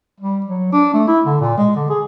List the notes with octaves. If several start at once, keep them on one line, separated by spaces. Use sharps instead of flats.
G3
F#3
D4
A3
E4
D3
A#2
G#3
D3
G#4